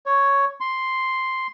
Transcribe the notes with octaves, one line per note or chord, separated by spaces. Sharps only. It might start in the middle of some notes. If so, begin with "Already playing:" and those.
C#5
C6